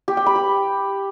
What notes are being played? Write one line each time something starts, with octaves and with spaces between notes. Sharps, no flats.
G4
G5
B5
G4